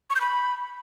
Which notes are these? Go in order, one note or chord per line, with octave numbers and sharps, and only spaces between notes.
C#6
G6
B5